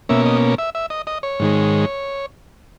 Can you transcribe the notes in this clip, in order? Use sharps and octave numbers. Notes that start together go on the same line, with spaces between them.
B2 A#3 C#4 E5
D#5
E5
E5
D#5
D#5
C#5
G#2 D#3 G#3